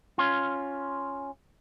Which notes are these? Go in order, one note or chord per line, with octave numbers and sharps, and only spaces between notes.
C#4 F4